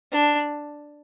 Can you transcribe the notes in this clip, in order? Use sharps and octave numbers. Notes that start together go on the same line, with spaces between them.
D4